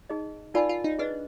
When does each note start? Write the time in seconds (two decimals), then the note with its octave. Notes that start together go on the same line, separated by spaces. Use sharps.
0.10 D#4 G#4 D#5
0.54 D#4 F4 A#4 D5 G#5 B5
0.69 F4
0.84 D#4
0.99 D4 G#4 B4 D#5